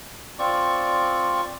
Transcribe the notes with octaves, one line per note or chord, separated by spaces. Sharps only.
C4 F4 D5 C#6